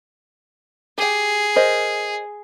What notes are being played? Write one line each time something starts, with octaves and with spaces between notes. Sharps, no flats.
G4 G#4 G5
A#4 C5 D#5